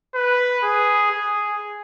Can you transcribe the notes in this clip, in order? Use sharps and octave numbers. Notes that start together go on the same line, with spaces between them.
B4
G#4
G#4